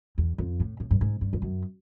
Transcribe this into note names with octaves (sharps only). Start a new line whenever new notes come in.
E2
F2
A2
A2
G2
G#2
G2
F2
F#2